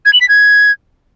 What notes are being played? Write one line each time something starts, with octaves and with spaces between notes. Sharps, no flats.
G#6
F#7
B6
G#6